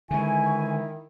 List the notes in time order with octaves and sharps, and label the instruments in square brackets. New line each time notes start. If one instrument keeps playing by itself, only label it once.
[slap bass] D3 G#3 [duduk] D#3 [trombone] E4 [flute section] G#5 C#6